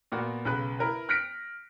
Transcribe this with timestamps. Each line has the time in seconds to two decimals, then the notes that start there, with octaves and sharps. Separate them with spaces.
0.12 A#2 A#3 B3 F#4
0.45 B1 C#3 B4 F#6
0.79 E4 A#4 B4
1.09 F6 F#6 A#6 B6 C#7 D7